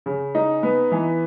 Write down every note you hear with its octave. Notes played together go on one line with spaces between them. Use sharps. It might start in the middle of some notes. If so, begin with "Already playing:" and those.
C#3
D#4
B3
E3